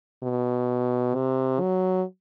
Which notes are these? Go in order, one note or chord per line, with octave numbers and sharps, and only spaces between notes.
B2
C3
F#3